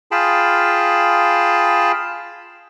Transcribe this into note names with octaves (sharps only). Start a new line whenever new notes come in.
F4 G#4 G5 A5 B5